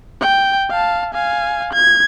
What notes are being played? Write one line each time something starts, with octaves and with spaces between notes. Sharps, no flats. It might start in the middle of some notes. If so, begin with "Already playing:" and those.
G5
F5 A5
F5 G#5
G#6